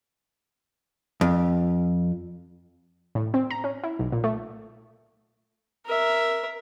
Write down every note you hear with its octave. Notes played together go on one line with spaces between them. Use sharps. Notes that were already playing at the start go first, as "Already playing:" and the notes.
F2
A2
C4
A#5
C#4
E4
B1
A#2
A3
A#4 E5